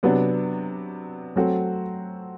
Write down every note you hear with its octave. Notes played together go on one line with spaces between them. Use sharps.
C3 F#3 B3 D4 F#4
F#3 A3 C4 F#4